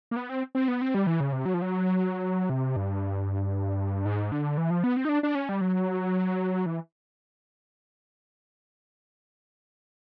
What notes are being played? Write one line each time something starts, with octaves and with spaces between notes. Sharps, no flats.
A#3
B3
C4
C4
B3
C4
G3
E3
C#3
C3
F#3
F3
F#3
C3
G2
G#2
D3
E3
F3
B3
C4
D#4
D4
D4
C#4
G3
F#3
E3